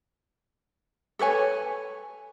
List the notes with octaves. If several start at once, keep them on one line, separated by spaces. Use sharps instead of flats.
A4 B4 C#5 G#5